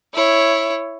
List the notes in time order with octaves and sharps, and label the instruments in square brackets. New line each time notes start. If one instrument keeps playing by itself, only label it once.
[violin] E4 C#5